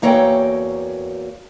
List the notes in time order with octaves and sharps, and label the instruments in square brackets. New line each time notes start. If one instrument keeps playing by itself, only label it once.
[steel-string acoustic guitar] E2 A#3 F#4 A4 C#5 G5